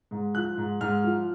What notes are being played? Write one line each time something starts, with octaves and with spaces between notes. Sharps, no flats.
G#2
F3 F#6
G#2
G#2 F6
F3